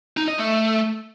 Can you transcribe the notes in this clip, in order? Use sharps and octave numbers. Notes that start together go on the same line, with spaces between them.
D#4
D#5
A3